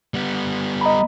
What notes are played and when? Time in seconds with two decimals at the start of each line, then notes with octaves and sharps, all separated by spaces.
0.14 G3 B3
0.81 D#5 A#5 B5